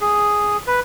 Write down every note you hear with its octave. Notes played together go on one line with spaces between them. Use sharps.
G#4
B4